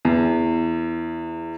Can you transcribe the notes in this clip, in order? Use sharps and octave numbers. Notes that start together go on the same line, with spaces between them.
E2